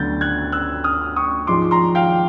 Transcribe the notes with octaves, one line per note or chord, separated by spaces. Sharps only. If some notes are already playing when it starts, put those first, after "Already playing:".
Already playing: D2 D3 F#3 B3 G6 A6
F#6 G#6
E6 F#6
D#6 F6
C#6 D#6
G#2 F3 G#3 C6 D6
A#5 C6
F5 G5